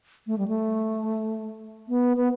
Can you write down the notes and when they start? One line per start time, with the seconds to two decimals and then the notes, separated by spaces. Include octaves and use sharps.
0.27 A3
0.38 G3
0.48 A3
1.88 B3
2.17 B3